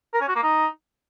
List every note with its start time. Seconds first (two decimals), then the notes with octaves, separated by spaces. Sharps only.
0.14 A#4
0.21 C#4
0.28 F#4
0.35 A#3
0.43 D#4